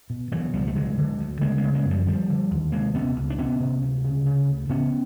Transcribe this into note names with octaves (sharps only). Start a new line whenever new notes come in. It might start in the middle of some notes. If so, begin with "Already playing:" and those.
B2
B2 E3 F#3
C#2 F3 G3
A3
D3 F#3 G#3
D3
D2
C#3 G#3 A#3
G#3 A#3
C#3
G#3 A#3
F#2
F3 G3
D3 F3 G3
D3
D#2
C3 G#3 A#3
C3 B3 C#4
C#2
D4
C3 B3 C#4
C3
D2
C#3
C#3
D2
C#3 B3 C#4